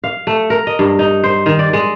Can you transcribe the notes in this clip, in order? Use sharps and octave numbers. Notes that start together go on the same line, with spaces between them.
F5
A3
A#4
D#5
G2
D#4
C5
D#3
D5
G#3